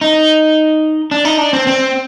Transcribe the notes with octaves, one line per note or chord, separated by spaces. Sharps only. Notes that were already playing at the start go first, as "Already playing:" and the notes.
D#4
D4
D#4
D4
C4
C4